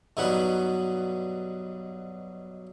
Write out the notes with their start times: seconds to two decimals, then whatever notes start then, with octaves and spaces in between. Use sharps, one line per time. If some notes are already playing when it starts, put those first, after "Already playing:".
0.17 G2 B2 F#3 D#4 B4 F#5